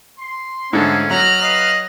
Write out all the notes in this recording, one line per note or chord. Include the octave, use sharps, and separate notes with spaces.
C6
G#2 D3 A3 C#4 F4 G#4 A4
F#3 D#5 A#5 F6 F#6
B4 D#5 F5